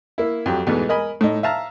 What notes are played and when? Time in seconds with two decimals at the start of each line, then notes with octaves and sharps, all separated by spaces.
0.18 A#3 E4
0.46 F2 F#3 G4
0.67 E2 G#2 B2 E3 A3 B3
0.89 A#4 D#5 G#5 B5
1.21 A2 D#4
1.43 E5 F5 A5 A#5